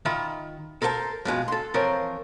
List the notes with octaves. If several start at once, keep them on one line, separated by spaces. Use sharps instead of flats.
D#3 F4 E5 B5
A4 A#4 C5 G5 A5
F2 B2 G#3 F4
A4 C6
E3 F3 C4 A#4 C5 C#5